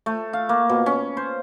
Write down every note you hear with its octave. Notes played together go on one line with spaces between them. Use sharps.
A3
F5
A#3
B2
C#4
C5